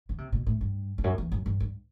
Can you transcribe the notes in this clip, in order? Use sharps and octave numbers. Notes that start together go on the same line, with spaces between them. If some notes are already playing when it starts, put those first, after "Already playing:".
D3
C3
B2
A2
G2
E2
F#2
E2
F#2
G2
G2